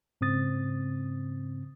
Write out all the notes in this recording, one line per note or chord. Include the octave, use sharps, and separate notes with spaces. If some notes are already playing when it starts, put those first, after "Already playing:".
G#2 C#3 C4 D#6 A6